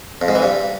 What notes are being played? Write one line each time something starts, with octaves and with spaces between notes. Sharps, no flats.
F2
G#2
E3
G2